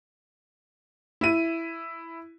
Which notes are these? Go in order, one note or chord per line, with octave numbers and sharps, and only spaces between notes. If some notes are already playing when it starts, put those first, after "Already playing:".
E4 D#7